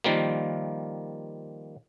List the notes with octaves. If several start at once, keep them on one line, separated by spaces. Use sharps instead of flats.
D#3 F3 G3 A#3